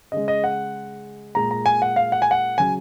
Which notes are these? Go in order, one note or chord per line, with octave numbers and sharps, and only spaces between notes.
C#3 G#3 D#5
D#5
F#5
A#2 G#3 A#5
A#5
G#5
F#5
F5
F#5
G#5
F#5
C#3 F#3 G#5